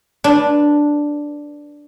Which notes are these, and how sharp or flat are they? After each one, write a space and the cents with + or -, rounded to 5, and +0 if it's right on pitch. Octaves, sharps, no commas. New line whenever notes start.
D4 +0 B4 -20